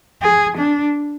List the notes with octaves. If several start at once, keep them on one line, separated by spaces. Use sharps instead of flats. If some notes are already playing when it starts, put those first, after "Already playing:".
G#4
D4